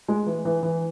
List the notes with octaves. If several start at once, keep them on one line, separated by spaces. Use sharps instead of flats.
G#3
E3
E3
E3